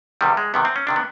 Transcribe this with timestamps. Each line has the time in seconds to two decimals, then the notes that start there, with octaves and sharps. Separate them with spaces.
0.21 E2 C3 D#3 G3
0.37 G#3
0.54 E2 C3 D#3 B3
0.65 C4
0.76 C#4
0.87 C3 D#3 D4
0.96 B3